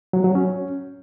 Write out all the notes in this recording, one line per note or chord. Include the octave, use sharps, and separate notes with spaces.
F#3
F#3
C#4